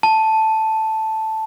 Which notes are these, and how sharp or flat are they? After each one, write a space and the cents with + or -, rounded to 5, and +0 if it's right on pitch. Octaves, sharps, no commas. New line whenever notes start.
A5 +0